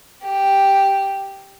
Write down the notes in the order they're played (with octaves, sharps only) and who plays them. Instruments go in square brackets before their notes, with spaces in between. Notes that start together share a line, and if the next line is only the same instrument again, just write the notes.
[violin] G4